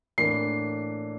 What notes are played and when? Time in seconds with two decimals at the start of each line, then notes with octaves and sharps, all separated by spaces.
0.18 A2 E3 A#3 D4 C7